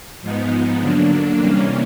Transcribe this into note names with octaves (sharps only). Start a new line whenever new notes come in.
G#2 F3 G#3 B3 D#4
D3 F#3 A#3 D4
C3 E3 G3 A#3 C#4